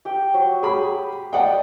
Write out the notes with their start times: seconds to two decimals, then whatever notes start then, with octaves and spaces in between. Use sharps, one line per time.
0.05 G4 G5
0.34 F#3
0.63 G4 G#4 B5
1.33 D5 D#5 F#5 G5 A5 D#6